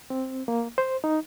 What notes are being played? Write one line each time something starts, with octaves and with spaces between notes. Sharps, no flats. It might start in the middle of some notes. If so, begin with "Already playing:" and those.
C4
A#3
C5
D#4